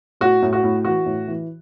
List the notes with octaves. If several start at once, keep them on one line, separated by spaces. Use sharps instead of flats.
A2 F#4
A2
F#4
A2
E3 F#4
A2
E3